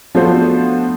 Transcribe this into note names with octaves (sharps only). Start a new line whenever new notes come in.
F3 A3 B3 D4 F#4 C5